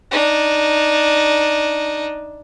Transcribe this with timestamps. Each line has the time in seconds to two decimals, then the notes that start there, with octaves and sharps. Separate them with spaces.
0.11 D4 D#4